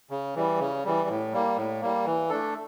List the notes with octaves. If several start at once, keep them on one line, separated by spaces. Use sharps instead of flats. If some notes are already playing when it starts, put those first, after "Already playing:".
C#3
E3 G3
C#3
E3 G3
A2
G3 A#3
A2
G3 A#3
E3
A3 D4 A4